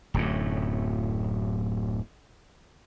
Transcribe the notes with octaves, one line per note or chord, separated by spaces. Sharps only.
D1 F#2 A2